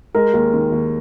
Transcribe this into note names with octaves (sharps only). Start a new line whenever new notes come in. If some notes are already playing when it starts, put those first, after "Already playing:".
G#3 A#4
D#2
D#3
D#2